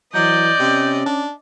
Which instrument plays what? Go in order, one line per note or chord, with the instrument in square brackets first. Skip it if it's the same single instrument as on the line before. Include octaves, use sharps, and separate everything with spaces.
[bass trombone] E3 [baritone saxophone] F#3 [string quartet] D5 D#5 [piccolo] G6
[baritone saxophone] C3 [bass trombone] C#4
[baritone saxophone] D4